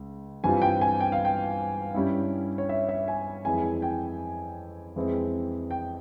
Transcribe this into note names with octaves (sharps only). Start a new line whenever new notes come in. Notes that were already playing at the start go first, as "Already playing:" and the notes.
Already playing: C#2
G2 E3 G3 C4 F4 G#5
G5
G#5
G5
F5
G5
G2 G3 C#4 E4
C#5
E5
E5
G#5
F2 E3 G#3 E4 G#5
G5
F2 E3 G#3 C4 E4
G5